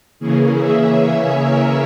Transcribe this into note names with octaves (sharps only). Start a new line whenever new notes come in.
C#3 E3 A#3 C#4 G#4
E5
C#5
A#4